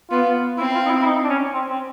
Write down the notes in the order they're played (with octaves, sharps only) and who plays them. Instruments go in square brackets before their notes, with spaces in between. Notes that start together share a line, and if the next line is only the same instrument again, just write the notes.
[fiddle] B3 [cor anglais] F4
[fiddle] C4 [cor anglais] E4
[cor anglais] F4
D#4
E4
E4
D#4
D4
C#4
C4
C4